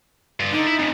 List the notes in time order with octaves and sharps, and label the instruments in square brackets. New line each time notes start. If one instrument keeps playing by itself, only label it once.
[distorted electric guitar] G2 F4
[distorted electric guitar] D3 [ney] D#4
[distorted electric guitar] E4
F2 C#3